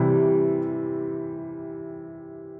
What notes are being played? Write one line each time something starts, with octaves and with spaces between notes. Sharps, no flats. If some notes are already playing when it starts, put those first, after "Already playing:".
Already playing: C3 E3 G3